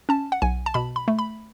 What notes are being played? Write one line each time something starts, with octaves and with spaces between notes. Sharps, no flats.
C#4 A5
F#5
B1 G#5
A5
B2 B5
B5
A3
B5